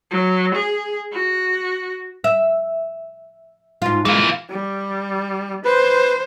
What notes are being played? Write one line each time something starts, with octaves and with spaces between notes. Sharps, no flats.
F#3
G#4
F#4
E5
G#2 F4
E3 G#3 F4
G3
B4 C5